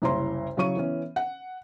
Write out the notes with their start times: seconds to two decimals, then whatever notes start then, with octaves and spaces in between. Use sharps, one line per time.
0.02 F#1 C2 E4 C#5 A#5 C6
0.57 C#3 F#3 E4 C#5 C#6 D#7
0.77 E3 B3 C#4
1.16 F#5